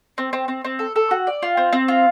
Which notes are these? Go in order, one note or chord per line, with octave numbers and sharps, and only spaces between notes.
C4
C4
C4
C4
A4
A4
F#4
D5
F4
C4
C4
F4